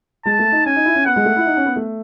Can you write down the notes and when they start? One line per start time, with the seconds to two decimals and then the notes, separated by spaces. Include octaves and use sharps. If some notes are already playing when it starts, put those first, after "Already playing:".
0.26 G#3 A5
0.39 A3
0.52 D#4
0.66 C#4 G#5
0.76 D#4
0.85 E4
0.95 C#4
1.06 B3 F#5
1.16 G#3
1.26 A3
1.36 E4
1.46 D#4
1.57 C#4
1.66 B3
1.76 A3